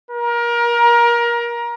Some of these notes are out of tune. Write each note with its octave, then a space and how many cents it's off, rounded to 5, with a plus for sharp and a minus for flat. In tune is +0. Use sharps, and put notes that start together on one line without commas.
A#4 +25